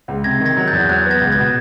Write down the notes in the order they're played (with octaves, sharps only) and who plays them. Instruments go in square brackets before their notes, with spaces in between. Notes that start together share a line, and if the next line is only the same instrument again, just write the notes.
[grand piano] C#2
[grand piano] C3 [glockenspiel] G#6 A#6
[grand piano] D#3
[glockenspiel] G#6 A#6
[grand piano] F#3
[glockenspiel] G6 A6
[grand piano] E2
[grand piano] F#3 [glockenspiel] F#6 G#6
[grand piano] B3
[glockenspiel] G#6 A#6
[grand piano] C#2
[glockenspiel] G#6 A#6
[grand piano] B2